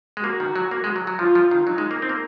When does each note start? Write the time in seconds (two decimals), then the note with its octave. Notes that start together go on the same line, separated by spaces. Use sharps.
0.17 G#3
0.24 A#3 F#4
0.40 D#3
0.56 F#3
0.71 A#3
0.84 G#3
0.96 F#3
1.07 F#3
1.19 F3 F4
1.35 F3
1.51 D#3
1.67 F#3 D#4
1.78 G#3
1.91 A#3
2.02 C4
2.09 A#3